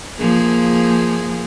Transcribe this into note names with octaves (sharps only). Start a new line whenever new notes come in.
F3 A#3 G#4